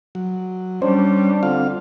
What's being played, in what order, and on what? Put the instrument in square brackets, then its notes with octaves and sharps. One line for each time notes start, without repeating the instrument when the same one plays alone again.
[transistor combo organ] F#3
[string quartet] G3 [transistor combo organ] C#4 [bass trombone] D4 [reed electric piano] C5
[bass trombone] D3 [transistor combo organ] C4 F4 F5